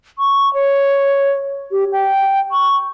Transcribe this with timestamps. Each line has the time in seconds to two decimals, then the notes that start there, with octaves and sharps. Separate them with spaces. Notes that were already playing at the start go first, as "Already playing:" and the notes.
0.19 C#6
0.54 C#5
1.71 G4
1.92 G5
2.52 C#6